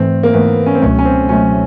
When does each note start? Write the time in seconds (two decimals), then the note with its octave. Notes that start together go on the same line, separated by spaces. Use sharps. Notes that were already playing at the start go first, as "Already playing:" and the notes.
Already playing: G#2 E3 A3 C4
0.23 A#3
0.34 G#2 E3 A3 B3
0.66 C#4
0.75 C4
0.81 C#2 B2 F#3 A3 C#4
0.99 C#4
1.05 C4
1.29 C#2 B2 F#3 A3 C#4